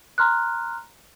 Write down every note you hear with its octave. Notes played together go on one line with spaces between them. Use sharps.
A#5 C6 F6 F#6